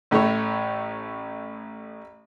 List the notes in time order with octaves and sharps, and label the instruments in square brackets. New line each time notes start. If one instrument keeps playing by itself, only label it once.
[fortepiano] A1 A2 A3 C#5